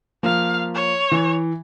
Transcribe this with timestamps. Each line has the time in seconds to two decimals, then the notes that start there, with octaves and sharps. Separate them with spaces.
0.23 F3 A#3 F5
0.75 C#5
1.11 E3